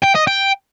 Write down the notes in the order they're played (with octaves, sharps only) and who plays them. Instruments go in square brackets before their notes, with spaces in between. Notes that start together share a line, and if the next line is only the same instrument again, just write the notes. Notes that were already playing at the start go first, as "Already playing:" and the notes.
[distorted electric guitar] G5
D#5
G5